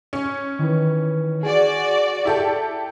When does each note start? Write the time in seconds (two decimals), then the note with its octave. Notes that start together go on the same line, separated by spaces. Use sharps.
0.13 C#4
0.59 D#3 E3 B4
1.43 F#4 G#4 D5
2.25 E4 G4 A4